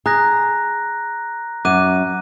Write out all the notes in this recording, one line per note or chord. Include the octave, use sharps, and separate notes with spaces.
G#4 A#5 F#6 A#6
F#2 D6 F#6 D#7